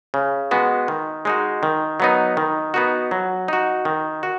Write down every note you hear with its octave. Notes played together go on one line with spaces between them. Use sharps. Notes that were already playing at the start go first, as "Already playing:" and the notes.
C#3
G#3 B3 F#4
D#3
G#3 D#4 F#4
D#3
F#3 B3 D#4
D#3
B3 D#4 F#4
F#3
D#4 F#4
D#3
F#4